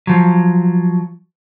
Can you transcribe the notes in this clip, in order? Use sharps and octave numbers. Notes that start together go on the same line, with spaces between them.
F3 F#3